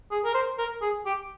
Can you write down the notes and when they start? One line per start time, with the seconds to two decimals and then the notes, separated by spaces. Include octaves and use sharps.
0.11 G#4
0.24 A#4
0.34 C5
0.58 A#4
0.81 G#4
1.06 G4